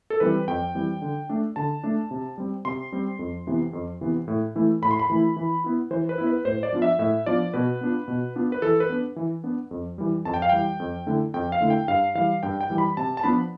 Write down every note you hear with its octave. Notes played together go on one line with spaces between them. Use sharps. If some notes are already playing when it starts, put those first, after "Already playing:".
A4
E3 G3 C4 B4
F2 G5
E3 G3 C4
D3
A3 D4
D3 A5
A3 D4
C3
G3 C4
C3 C6
G3 C4
F2
C3 E3 B3
F2
C3 E3 B3
A2
E3 A3 E4
A2 B5
C6
B5
E3 A3 E4
E3
B3 E4
E3 C5
B4
B3 E4
B4
A2 C5
D5
F3 B3 D4 F4
E5
A2 E5
F3 B3 D4 F4 D5
B2 B4
B3 D4 F4
B2
B3 D4 F4
B4
E3 A4
B4
B3 D4
E3
B3 D4
F2
E3 G3
F2 A5
G5
F5
E3 G3 G5
F2
D3 A3 E4
F2 G5
F5
D3 A3 E4
G5
G2 F5
E3 G3 F5
G2 G5
G5
E3 G3
B5
C3 A5
A5
F3 B3 D4 F4 B5